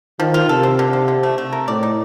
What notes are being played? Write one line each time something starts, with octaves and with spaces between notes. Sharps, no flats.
D#3 F3
F4
C3 A4
C4
D3
C4
D3
A3
A3
A#4
A2 D5
D#4